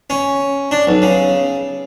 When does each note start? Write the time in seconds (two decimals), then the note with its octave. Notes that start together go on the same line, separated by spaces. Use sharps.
0.10 C#4
0.71 D4
0.87 B1
1.02 C#3